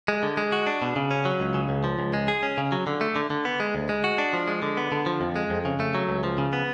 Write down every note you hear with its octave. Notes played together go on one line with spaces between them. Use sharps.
G#3
D3
G#3
F#4
D4
B2
C#3
C#4
F#3
C#2
C#3
C#2
F3
C#2
G#3
G#4
C#4
C#3
F#3
D3
A3
D3
D3
B3
G#3
D2
G#3
F#4
D4
F3
G#3
D3
B3
D3
F3
F2
G#3
F2
C#3
A3
F#3
C#2
F3
C#3
B3